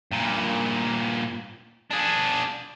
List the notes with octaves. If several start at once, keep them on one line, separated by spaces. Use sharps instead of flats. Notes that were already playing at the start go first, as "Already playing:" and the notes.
G2 A#2
D4 G#4